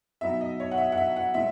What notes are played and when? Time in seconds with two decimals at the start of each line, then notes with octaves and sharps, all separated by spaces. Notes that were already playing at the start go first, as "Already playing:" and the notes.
0.21 B2 F#3 B3 D#4 E5
0.41 D#5
0.60 C#5
0.71 F#5
0.78 E5
0.92 F#5
0.98 E5
1.16 F#5
1.34 A#2 G#3 E5